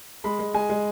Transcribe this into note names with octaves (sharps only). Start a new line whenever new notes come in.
G#3 B5
G#3
G#3 G#5
G#3